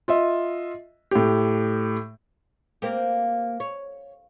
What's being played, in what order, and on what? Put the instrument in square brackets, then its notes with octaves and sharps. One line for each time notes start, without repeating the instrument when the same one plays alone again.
[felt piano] F4 D#5 E5
A2 G4
[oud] A#3 C4 G4
C#5